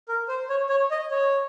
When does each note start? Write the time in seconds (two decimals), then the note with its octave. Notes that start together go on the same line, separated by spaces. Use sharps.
0.09 A#4
0.28 C5
0.50 C#5
0.69 C#5
0.91 D#5
1.11 C#5